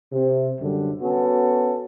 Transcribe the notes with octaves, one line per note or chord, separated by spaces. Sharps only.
C3
F#2 D3 G3
B3 C#4 F#4 A4